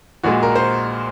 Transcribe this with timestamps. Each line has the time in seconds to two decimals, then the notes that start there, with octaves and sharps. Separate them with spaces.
0.23 A#1 A#2 G#3 F#4
0.43 A#4
0.55 C5